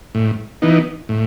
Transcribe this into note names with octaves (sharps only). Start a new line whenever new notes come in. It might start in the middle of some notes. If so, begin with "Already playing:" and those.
A2
E3 B3 D#4
A2